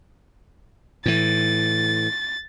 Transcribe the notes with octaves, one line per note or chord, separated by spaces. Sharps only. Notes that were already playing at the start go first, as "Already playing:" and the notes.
A2 E3 A6